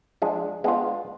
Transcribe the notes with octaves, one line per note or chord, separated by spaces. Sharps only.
F3 G#3 D4
G#3 B3 D4 F4